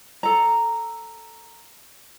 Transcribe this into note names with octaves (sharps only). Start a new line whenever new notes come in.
A4 A#5